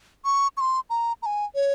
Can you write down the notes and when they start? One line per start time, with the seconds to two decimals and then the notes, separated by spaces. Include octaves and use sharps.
0.25 C#6
0.57 C#6
0.61 C6
0.90 A#5
1.22 A#5
1.26 G#5
1.55 C#5